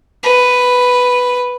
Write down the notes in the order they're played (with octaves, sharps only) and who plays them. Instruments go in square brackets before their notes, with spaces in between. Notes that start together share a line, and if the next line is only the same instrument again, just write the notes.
[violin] B4